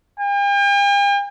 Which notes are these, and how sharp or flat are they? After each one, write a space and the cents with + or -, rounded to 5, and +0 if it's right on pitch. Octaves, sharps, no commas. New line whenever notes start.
G5 +45